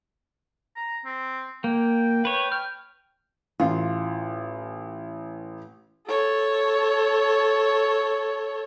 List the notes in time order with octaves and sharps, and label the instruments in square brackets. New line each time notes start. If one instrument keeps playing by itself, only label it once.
[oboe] A#5
C4
[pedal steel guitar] A#3 [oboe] G5
[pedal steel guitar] B4 C#5
[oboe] G5 [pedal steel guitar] F6
[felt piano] A1 [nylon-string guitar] F4
[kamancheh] A4 C#5